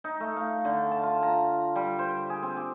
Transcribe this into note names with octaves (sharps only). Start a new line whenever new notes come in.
D#4
A3
F5
D3
A5
F4
A#5
G3
C5
G#4
C4
G4